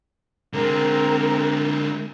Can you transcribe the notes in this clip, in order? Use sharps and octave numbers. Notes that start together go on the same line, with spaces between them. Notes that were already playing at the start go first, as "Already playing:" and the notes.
D3 G#3 C4 A#4